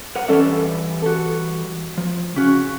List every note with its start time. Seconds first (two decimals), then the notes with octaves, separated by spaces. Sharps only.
0.16 A#4 F#5
0.28 E3 G3 C#4 A4 D5 E5
1.02 F#4 A4
1.98 F3
2.36 C#3 C#4 F#4